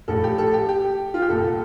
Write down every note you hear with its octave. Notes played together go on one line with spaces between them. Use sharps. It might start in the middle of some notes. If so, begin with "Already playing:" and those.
A#1 A2 A4
G4
A4
G4
G4
F4
G4
C2 A#2 A4